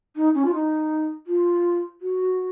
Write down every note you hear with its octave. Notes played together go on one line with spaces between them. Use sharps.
D#4
C#4
F4
D#4
F4
F#4